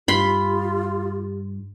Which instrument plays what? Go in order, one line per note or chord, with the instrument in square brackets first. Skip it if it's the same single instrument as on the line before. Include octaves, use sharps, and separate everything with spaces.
[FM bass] G2 [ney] F4 [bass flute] G4 [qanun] B5 C6